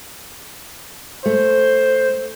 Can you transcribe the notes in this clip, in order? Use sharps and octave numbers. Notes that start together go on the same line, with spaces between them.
A3 C5